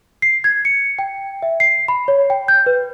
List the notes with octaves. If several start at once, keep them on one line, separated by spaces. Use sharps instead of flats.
C7
G#6
C#7
G5
E5
C7
B5
C#5
G5
G6
B4